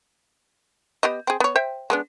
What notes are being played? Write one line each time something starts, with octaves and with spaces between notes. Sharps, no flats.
B3 G4 D#5
C4 G#4
B3 C#5
C5 E5 G5
G#3 B3 D4